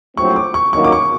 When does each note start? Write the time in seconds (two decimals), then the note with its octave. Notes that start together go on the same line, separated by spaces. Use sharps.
0.17 A#1 A2 F#3 A3 C4 C#6
0.36 D6
0.54 C#6
0.73 G1 F#2 D#3 F#3 A#3 C#6
0.84 D6
0.92 C#6